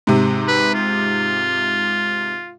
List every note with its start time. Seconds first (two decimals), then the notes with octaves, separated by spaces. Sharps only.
0.07 G#2 C3
0.48 B4
0.74 F4